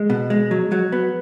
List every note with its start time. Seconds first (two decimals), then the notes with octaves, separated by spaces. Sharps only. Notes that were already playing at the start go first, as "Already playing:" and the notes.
Already playing: G#3
0.10 B2
0.30 G#3
0.51 F#3
0.72 F#3
0.92 B3